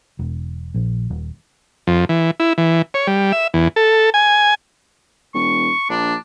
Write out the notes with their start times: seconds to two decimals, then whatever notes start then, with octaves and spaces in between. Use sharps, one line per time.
0.19 E1
0.74 A#1
1.10 D#1
1.87 F2
2.09 E3
2.40 E4
2.58 E3
2.94 C#5
3.07 G3
3.32 E5
3.54 E2
3.76 A4
4.14 G#5
5.34 E1 C#6
5.90 A#1 D4